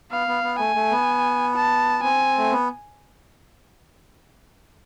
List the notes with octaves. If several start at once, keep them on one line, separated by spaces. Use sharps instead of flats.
B3 F5
B3
B3
A3 G#5
A3
B3
A5
C4 G#5
A3
B3